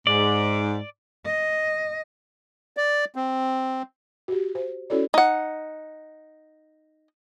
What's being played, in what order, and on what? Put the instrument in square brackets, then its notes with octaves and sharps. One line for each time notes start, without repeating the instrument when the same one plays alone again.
[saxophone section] G#2 [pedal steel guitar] D5
[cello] D#5
[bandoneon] D5
C4
[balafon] F#4 G4
C5
C#4 E4 F#4 A4 C#5 D5
[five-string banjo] D#4 F#5